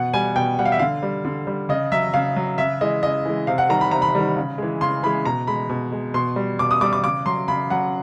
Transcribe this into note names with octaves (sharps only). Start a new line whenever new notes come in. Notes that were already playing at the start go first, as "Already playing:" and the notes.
Already playing: B2 F#5
G3 G#5
B2 G5
G3 F#5
F5
E5
D3 F5
G3
D3
G3
C#3 D#5
F#3 E5
C#3 F5
F#3
C#3 E5
E3 G#3 D#5
C#3 D#5
E3 G#3
C3 F5
F#5
D#3 G3 A#5
B5
C3 A#5
B5
D#3 G3
C#3
E3 G#3
C#3 C6
E3 G#3 B5
B2 A#5
G#3 B5
B2
G#3
B2 C6
G3
B2 D6
D#6
G3 D6
D6
C#3 D6
F#3 C6
C#3 B5
F#3 F#5